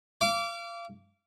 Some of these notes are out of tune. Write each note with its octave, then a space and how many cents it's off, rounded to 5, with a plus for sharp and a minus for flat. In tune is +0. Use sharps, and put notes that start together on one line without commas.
F5 -30 D6 -25